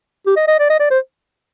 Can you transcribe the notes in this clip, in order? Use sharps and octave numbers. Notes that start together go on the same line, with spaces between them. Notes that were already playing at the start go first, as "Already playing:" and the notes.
G4
D#5
D#5
D5
D#5
D5
C5